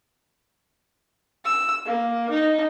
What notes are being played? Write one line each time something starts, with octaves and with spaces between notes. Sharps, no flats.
E6
A#3
D#4